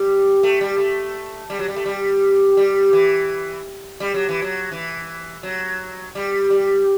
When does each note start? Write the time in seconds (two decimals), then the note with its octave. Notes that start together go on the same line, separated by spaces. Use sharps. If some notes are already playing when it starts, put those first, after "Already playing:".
Already playing: G3
0.43 A3
0.61 G3
0.78 A3
1.50 G3
1.59 F#3
1.68 G3
1.76 A3
1.86 G3
2.57 G3
2.93 E3
4.00 G3
4.14 F#3
4.29 E3
4.42 F#3
4.71 E3
5.43 F#3
6.15 G3
6.50 G3